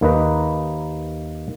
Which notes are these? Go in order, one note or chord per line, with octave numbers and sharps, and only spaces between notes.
D#2 A#3 D#4 B4 D#5